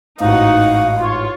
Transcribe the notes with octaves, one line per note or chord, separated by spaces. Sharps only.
A1 G#2 D#4 F#4 F5 F#5
F4 C#5